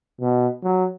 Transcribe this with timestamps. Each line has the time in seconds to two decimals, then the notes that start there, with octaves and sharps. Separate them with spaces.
0.21 B2
0.64 F#3